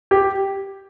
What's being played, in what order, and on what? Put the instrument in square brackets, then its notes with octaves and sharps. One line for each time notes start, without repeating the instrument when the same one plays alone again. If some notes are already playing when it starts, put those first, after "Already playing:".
[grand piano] G4